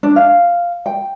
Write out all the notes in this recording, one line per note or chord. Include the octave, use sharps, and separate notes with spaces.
D4
F5
G5